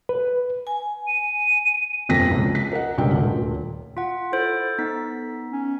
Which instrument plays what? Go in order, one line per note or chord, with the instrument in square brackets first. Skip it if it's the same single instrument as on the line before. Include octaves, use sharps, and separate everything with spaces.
[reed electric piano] B4
[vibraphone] G#5
[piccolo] D#7
[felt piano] G1 F2 A#3 C4 A#6 B6
C#2
B6
A#4 D#5 F#5
C#2 G2 G5
D#1 D2
[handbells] F4 F#5
[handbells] E4 C5 [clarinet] A4
[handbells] B3 D#4 B6
[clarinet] C#4